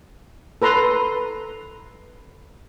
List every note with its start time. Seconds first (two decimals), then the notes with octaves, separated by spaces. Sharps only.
0.62 A4 B4 A#5 C6